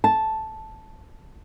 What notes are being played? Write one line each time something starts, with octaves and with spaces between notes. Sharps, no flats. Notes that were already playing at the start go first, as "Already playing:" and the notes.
A5